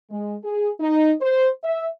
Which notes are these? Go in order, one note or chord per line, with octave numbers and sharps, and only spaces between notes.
G#3
G#4
D#4
C5
E5